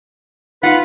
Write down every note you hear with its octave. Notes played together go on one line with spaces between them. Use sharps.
D#4 F4 B4 F5 F#5